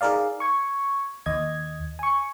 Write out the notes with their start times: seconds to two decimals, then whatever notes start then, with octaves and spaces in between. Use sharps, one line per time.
0.01 D#4 G#4 A#4 D5 F5
0.40 C#6 G#6
1.26 D#2 D#5 G#6
1.99 G#5 C#6